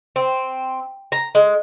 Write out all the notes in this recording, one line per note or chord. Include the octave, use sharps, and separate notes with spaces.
C4
A#5
G#3